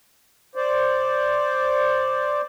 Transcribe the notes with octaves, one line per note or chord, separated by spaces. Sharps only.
C5 D5